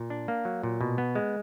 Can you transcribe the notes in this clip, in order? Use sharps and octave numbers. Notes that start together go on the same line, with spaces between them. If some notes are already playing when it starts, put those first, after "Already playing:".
Already playing: A#2
D4
A#3
F#3
A#2
B2
B3
G#3